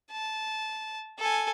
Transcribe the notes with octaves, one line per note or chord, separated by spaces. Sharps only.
A5
A4 G#5